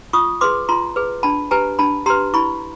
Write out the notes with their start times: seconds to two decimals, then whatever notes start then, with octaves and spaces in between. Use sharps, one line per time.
0.13 F4 C#6 D#6
0.41 G#4 B4 C6 D6
0.69 F4 A#5 C6
0.96 G#4 B4
1.23 D4 A5 B5
1.51 G4 B4 G#5 A#5
1.79 D4 A5 B5
2.06 G4 B4 A#5 C6
2.34 E4 B5 C#6